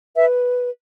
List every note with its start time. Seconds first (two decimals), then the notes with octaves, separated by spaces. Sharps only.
0.16 B4 E5